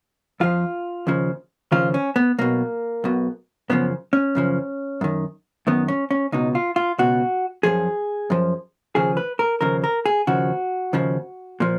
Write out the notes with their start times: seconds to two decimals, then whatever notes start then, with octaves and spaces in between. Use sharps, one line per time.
0.40 F2 F3 F4
1.07 D#2 C#3 F3
1.72 D#2 C#3 F3 F4
1.94 C#4
2.16 B3
2.38 B1 B2 A#3
3.04 B1 B2
3.70 F#2 C#3 F3 B3
4.13 C#4
4.35 F#2 C#3 F3
5.01 F#2 D#3
5.67 F#2 D#3 B3
5.88 C#4
6.11 C#4
6.32 C#2 B2 D#4
6.55 F4
6.76 F4
6.98 C#2 B2 F#4
7.63 F#2 F3 G#4
8.30 F#2 F3
8.95 D#2 C#3 F3 G#4
9.17 B4
9.39 A#4
9.61 D#2 C#3 F3 A#4
9.84 A#4
10.06 G#4
10.27 D#2 C#3 F3 F#4
10.93 D#2 C#3 F3
11.60 A#2 F3